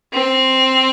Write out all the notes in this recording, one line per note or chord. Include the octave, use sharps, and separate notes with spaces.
C4